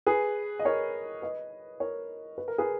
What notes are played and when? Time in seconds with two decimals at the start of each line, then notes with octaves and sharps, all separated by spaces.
0.07 G#4 B4
0.59 D#5
0.65 A#4 C#5
1.22 B4 D#5
1.80 A#4 C#5
2.38 B4
2.48 A#4
2.58 G#4 B4